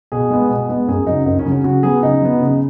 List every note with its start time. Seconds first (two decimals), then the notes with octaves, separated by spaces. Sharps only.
0.12 B2 G#4
0.30 G#3 B3
0.49 B2
0.69 G#3 B3
0.88 F#2 G#4
1.07 C#3 F#3 D#4
1.26 F#2 D#4
1.39 C#4
1.45 C#3 F#3
1.52 C#4
1.64 C#3 F#4
1.83 F#3 B3 G#4
2.03 C#3 D#4
2.22 F#3 B3
2.40 C#3